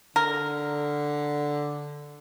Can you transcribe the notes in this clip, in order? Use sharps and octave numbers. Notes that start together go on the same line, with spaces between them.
D3 A#4